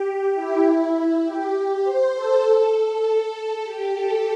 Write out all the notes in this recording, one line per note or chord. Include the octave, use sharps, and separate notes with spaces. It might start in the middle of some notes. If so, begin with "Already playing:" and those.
Already playing: G4
E4
E4
G4
C5
A4
A4
A4
G4
A4